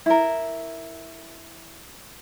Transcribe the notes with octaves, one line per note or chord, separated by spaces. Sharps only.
E4 A#4